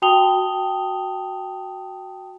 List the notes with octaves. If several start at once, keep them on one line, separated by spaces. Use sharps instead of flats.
F#4 G5 A5 D#6 F7 G7